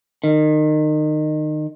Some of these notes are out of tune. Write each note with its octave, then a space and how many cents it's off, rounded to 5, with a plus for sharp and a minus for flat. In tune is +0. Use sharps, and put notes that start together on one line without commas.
D#3 -25